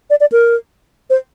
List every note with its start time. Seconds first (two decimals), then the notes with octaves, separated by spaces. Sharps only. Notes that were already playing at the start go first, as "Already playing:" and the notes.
0.10 D5
0.20 D5
0.32 A#4
1.10 C5